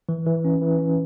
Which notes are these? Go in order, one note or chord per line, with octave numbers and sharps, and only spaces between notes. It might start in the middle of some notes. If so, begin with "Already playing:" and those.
E3
E3
C#4
E3
C#4